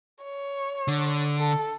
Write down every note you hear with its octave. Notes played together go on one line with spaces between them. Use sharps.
C#5
D3
A4